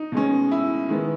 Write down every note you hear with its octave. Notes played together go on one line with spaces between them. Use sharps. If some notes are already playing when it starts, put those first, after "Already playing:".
Already playing: D#4
B2 G#3 C#4
E4
D#3 G#3 B3